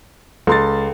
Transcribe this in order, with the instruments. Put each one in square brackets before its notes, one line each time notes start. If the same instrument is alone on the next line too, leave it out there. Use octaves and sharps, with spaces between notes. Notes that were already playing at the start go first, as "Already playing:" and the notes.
[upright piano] C#2 C6 A6 [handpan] A4